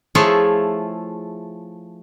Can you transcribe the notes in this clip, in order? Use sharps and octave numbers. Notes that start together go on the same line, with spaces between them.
F3 A3 E4 F4 G#4 C#5